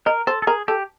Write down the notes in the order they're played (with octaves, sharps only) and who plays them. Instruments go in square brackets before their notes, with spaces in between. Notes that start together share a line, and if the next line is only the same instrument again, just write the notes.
[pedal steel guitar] A#4 [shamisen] D#5
[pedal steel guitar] A4 [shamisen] C5
[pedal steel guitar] A4
[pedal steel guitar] G#4 [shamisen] A#4
[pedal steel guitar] G4 [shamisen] A4